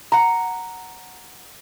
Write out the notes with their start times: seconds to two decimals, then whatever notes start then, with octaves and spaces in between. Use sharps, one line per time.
0.12 F#5 A#5